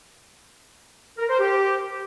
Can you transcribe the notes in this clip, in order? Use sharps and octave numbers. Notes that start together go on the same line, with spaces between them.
A#4
C5
G4